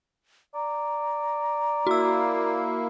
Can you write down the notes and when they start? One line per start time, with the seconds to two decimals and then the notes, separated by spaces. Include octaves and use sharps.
0.55 D5 A#5
1.87 A#3 E4 F#4 E6